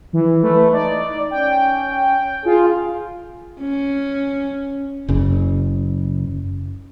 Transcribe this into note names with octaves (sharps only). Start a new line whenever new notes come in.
E3
A3 B4
D#4 D5
C#4 G5
F4 G#4
C#4
F#1 C#3